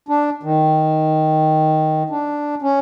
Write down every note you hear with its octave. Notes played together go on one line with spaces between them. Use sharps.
D4
D#3
D4
C#4